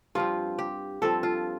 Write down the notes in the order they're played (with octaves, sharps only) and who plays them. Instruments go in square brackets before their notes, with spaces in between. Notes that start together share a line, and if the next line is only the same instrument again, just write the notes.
[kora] G2 F3 C4 F4
G4
G2 F3 C4 A4
F4